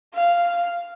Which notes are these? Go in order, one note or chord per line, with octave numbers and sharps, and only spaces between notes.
F5